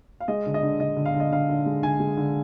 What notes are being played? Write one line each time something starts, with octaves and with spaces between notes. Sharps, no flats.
F5
G#3 D#5
D3
D#5
D3
D3 D#5
D3
F5
D3
D#5
D3 F5
D3
G#3
D3 G#5
G#3
D3